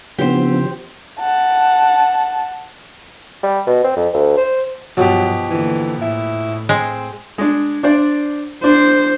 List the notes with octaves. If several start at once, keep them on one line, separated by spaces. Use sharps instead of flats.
C#3 F3 B3 C4 D4 E4 G4 C5
F#5 A5
G3
B2
C4
F2
D2
C5
G2 B2 F3 F#3 G4
D3 E3 A#3
A2 E4
G#3 C4
G#3 D4
D4 C5 D5
D4 C5